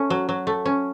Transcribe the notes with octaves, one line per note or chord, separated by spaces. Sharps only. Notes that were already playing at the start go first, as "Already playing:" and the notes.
Already playing: A3 C#4
F#3
F#3
A3
C#4